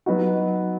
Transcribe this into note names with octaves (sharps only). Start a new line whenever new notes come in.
F#3 B3 D#4 F#4